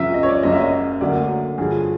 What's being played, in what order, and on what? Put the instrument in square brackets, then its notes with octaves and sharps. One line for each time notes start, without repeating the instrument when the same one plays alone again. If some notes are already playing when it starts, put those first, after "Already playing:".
Already playing: [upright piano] F#2 C#3 F3 E5
D#5
C#5
D5
F#1 F#2 C#3 D#5
E5
D#5
D2 D3 F#3 A#3 D5
G2 D3 F3 G#4